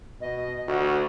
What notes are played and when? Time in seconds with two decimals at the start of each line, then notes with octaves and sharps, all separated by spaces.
0.21 B2 D#5
0.67 D2 F#4